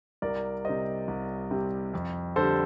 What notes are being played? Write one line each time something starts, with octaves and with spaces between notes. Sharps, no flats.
C2 A#4 D5
C3 G3 C5 D#5
C2
C3 G3
F2
D3 G3 A4 C5